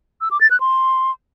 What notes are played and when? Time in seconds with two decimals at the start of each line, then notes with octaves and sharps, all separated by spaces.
0.21 E6
0.31 D6
0.41 A6
0.51 F#6
0.60 C6